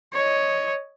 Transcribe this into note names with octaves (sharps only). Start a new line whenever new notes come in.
C#5 D#5